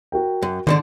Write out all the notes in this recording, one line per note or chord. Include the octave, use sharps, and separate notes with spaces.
F#4 A#4 G5
F#2
G#2 D3 D#3 D4